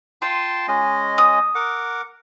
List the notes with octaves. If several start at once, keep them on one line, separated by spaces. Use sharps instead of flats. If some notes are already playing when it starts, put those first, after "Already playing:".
F4 G5 A5 C6
G#3 C#4 D#5
D#6
A#4 F#5 D6